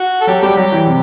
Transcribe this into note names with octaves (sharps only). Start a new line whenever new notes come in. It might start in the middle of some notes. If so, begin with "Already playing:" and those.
Already playing: F#4
A4
F#3 G4
G3 G4
F#3 G4
E3
C3